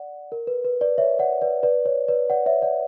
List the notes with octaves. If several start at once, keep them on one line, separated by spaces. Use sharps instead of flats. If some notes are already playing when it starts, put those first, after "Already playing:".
Already playing: D5 F#5
A#4
B4
B4
B4 D5
C#5 E5
D5 F#5
B4 D5
B4 D5
C#5
B4 D5
D5 F#5
C#5 E5
D5 F#5